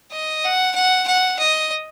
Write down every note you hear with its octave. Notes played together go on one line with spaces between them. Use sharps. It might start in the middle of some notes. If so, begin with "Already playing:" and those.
D#5
F#5
F#5
F#5
D#5